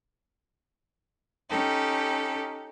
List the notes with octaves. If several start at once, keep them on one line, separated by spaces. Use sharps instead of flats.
C#4 D#4 G4 A4